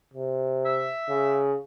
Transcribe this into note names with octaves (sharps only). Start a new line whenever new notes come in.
C3
E5
C#3